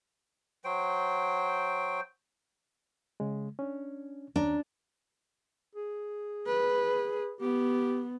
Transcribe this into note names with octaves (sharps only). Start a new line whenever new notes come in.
F#3 C5 G5
C#3 G#3
C#4 D4
D#2 C#4 D4 A#5
G#4
B4
B3 G4